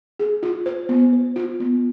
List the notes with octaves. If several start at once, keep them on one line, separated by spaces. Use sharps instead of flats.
G#4
F4
C5
B3
C5
F4
B3